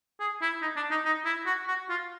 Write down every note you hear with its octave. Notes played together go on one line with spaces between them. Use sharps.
G#4
E4
D#4
D4
D#4
D#4
E4
F#4
F#4
F4